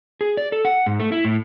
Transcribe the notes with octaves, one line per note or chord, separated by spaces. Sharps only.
G#4
D5
A4
F#5
G#2
A3
E4
A2